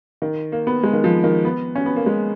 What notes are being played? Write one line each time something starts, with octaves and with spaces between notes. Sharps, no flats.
D#3
A#3
B3
G#3
D#3
F3
D#3
B3
C#4
B3
A#3
G#3